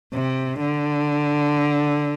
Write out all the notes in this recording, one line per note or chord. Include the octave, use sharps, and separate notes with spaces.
C3
D3